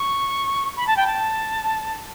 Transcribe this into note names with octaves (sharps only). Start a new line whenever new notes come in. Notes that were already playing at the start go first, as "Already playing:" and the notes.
Already playing: C#6
B5
A5
G5
A5